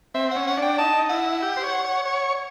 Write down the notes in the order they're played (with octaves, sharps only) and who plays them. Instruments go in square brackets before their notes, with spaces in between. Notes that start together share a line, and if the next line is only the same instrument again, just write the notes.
[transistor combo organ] C4 [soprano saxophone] E5
[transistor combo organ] C#4 [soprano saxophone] F#5
[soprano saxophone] F#5
[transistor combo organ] D4 [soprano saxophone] G5
[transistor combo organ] D#4 [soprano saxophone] A5
[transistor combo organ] E4 [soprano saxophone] F#5
[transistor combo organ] G4
C5
C#5
C#5
C#5